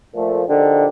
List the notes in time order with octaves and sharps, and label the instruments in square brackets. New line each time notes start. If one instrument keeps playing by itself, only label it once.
[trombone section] A#2 F3 A3
A#1 D3 D#4 G4